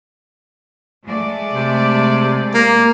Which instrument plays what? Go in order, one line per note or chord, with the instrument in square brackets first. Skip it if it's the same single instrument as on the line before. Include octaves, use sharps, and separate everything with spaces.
[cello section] G#3 A3 D5
[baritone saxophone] C3
A#3